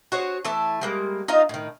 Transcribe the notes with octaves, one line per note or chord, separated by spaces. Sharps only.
F#4 G#4 C5 C#5
E3 A3 A4 A5
G3 G#3 A#3
D#4 F4 D#5 F5
A2 D#3